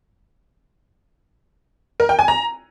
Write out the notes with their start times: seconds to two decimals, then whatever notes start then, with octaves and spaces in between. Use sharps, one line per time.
2.00 A#4
2.09 G5
2.19 G#5
2.28 A#5